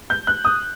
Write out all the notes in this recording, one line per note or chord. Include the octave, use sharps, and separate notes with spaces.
G6
F#6
D#6